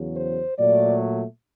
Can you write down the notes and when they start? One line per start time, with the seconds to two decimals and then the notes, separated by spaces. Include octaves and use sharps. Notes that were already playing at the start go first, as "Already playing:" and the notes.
Already playing: E2 C#3 F#3
0.17 C5
0.58 A#2 F#3 A3 D5